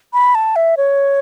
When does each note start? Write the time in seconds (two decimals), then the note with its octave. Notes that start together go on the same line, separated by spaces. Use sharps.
0.13 B5
0.35 A5
0.56 E5
0.77 C#5